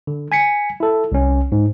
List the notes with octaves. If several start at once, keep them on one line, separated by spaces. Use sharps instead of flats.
D3
G#5 B6 C#7
E4 A4
C2 C#4
G#2